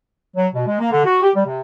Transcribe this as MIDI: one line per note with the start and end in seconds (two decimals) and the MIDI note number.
0.35 0.47 54
0.53 0.64 47
0.67 0.78 56
0.79 0.89 58
0.91 1.02 50
1.05 1.21 66
1.22 1.30 67
1.34 1.44 55
1.46 1.60 48